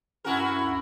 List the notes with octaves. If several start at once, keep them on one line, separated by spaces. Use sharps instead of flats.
G2 C#4 E4 F#4 A#4 G#5
D2